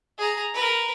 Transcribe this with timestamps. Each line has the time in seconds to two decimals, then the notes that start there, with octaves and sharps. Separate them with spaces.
0.18 G#4 A#5
0.54 A#4 B4